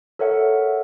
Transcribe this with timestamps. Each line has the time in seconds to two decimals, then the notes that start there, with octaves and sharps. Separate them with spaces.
0.19 A4 A#4 C#5 E5 F#5